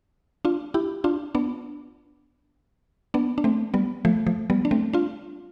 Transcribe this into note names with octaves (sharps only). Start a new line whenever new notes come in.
D4 F4
E4 G4
D4 F4
B3 D4
B3 D4
D4
A3 C4
G3 B3
F3 A3
F3 A3
G3 B3
D4
A3 C4
D4 F4